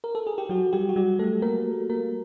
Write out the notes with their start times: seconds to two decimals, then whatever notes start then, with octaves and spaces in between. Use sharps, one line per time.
0.04 A#4
0.15 A4
0.27 G#4
0.38 G4
0.49 F#3 F#4
0.73 G3 G4
0.89 F#4
0.96 G3 G4
1.19 A3 A4
1.42 A#3 A#4
1.90 A#3 A#4